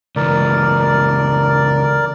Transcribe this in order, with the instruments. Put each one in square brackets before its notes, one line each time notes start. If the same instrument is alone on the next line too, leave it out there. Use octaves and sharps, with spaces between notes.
[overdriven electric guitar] C#2 E3 [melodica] A#4 D5